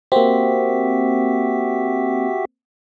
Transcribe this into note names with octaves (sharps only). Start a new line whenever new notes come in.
A#3 C4 F#4 G4 E5